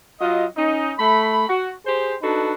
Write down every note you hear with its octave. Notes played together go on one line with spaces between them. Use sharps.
F#3 F4 D#5
C#4 D#4
A3 B5
F#4
G4 G#4 C5
D4 D#4 F#4 A4 B4